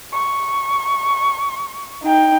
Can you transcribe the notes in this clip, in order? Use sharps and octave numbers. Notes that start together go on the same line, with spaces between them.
C#6
D#4 G5